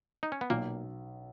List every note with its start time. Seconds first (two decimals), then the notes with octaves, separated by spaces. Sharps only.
0.23 D#4
0.32 C#4
0.41 B3
0.50 B1 A#2 A#3